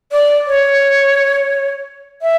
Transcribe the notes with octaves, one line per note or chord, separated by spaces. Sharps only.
D5
C#5
E5